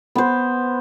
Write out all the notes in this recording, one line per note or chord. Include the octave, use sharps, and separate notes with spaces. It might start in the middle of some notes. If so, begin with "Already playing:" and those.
B3 C5